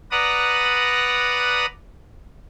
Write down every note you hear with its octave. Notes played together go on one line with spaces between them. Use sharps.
B4 D5 F#5 A#5 D#6